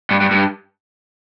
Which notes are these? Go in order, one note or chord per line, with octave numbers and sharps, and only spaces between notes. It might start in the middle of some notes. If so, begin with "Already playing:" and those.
G2
G2
G2